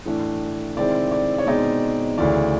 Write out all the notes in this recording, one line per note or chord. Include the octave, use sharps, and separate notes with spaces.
A2 E3 A3 D4
C3 D#3 G#3 C4 E4 D5
D5
C#5
B2 G#3 C4 D#4 D5
D2 C#3 E3 D5